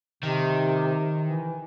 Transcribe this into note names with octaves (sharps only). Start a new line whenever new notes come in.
C3 D#3
E3